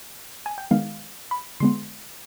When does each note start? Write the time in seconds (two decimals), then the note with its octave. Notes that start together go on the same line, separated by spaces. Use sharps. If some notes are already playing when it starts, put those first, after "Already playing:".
0.46 G#5
0.58 G5
0.71 D#3 G#3 B3 F5
1.31 B5
1.60 D3 G#3 B3 C6